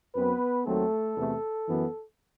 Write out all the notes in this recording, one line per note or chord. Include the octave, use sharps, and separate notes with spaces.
F#2 F#3 B3 C4 B4
D#2 D#3 F#3 A3 C4 A4
E2 C3 E3 A3
F#2 E3 B3